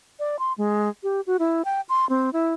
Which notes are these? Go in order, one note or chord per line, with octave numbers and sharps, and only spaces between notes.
D5
C6
G#3
G4
F#4
E4
G5
C6
C4
E4